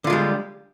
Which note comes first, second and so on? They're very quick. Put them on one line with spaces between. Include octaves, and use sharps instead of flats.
D3 F4 G#3 G3